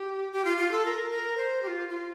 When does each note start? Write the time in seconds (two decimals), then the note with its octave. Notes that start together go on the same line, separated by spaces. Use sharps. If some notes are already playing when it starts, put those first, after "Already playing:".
Already playing: G4
0.32 G4
0.45 F4
0.58 F4
0.72 A4
0.85 A#4
1.11 A#4
1.37 C5
1.63 G4
1.67 F4
1.89 F4